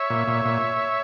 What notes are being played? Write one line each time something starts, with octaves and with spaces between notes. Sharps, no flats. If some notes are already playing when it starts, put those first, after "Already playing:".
Already playing: C#5 E5
A#2
A#2
A#2